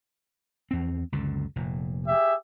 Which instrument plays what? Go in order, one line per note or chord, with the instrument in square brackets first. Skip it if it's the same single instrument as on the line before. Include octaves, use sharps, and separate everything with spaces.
[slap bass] E2 C4
C#2 F#2 D3
F1 A#2
[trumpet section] G4 G#4 E5